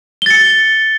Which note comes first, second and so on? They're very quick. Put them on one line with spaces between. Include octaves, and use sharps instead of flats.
G7 A6 C#7